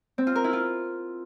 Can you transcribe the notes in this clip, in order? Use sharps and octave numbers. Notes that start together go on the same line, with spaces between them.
C4
F4
A#4
E4
F4